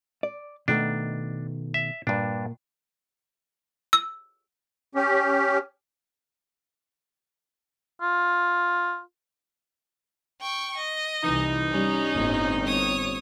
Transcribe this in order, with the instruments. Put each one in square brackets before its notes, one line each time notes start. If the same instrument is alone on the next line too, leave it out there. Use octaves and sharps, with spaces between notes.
[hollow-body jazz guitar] D5
[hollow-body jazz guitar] B2 D#3 A3 [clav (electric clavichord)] D4
[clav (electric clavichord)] E5
[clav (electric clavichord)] G2 D4 [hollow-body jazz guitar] A#2
[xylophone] E6
[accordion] C#4 G4
[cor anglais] F4
[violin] G5 C#6
D#5
[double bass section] C2 E3 [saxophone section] D#4
[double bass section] G3 [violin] C#4
[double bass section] G1 A2 C4
[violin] C#5 D#6